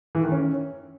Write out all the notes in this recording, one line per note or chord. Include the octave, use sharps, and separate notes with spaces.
E3
D#3
C#4